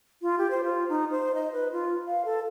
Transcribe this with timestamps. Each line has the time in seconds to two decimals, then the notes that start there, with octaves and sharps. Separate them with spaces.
0.22 F4
0.39 G4
0.50 C5
0.64 F4
0.89 D#4
1.11 C5
1.35 D#5
1.53 B4
1.72 F4
2.08 F5
2.25 A4